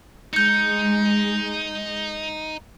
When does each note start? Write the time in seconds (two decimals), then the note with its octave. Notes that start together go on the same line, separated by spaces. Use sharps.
0.34 G#3 D#4 G6 C#7